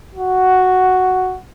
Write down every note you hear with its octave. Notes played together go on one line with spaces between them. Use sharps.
F#4